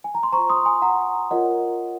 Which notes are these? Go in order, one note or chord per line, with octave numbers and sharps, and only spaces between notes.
G#5
A#5
C6
F4 C5 A#5 C#6
C6 D#6
G#5 C6
F#5 A#5
F4 A#4 C#5 D#5 F#5